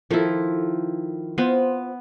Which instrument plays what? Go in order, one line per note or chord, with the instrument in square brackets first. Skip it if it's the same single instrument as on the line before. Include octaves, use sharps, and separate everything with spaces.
[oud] D#3 A4 [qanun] F3 E4
[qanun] B3 [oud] C4 F4